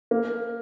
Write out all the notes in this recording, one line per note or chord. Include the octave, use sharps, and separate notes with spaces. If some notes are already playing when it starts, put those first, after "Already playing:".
A#3